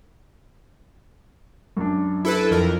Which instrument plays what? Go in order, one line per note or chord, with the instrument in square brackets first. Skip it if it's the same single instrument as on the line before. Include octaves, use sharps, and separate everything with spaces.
[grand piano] F#2 D4
[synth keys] E4 A4 B4
F2 A#4